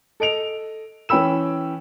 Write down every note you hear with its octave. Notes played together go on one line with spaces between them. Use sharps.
A4 D#5 D7 F7
E3 C#4 G5 B5 E6 E7